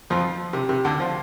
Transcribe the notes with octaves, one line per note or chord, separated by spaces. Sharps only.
F2 F3
C3
C3
D2 D3
F3